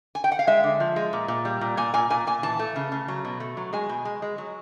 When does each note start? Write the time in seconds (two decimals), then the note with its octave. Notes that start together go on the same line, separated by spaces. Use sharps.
0.15 G#5
0.24 G5
0.32 F#5
0.39 F5
0.47 G#3 E5
0.64 D3
0.80 F3
0.96 G#3
1.13 A#2
1.28 A#2
1.45 G3
1.61 A#2
1.77 A#2 G#5
1.94 A#2 G#5
2.10 A#2 G#5
2.27 A#2 G#5
2.43 E3 A5
2.59 A3
2.76 C#3
2.92 C#3
3.08 F#3
3.25 B2
3.40 A3
3.57 F#3
3.73 G#3 G#5
3.89 B2
4.05 G#3
4.22 G#3
4.38 F#3